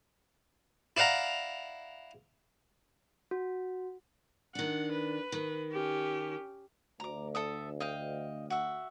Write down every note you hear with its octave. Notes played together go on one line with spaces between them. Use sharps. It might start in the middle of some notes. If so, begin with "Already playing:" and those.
E4 D5 F5 F#5 A#5
F#4
D#3 D4 F#5
B4
D#3
C#4 G4
D2 A#5 D6
A4 E5 D#6
D#5 F5 G5
F#4 E5